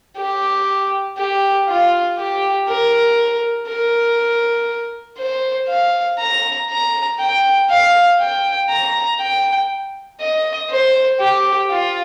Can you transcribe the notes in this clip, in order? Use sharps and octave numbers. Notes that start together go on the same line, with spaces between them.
G4
G4
F4
G4
A#4
A#4
C5
F5
A#5
A#5
G5
F5
G5
A#5
G5
D#5
C5
G4
F4